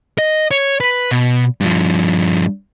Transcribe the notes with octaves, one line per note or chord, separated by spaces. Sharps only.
D#5
C#5
B4
B2
G2 F3